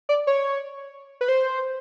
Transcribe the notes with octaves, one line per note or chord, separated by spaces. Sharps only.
D5
C#5
B4
C5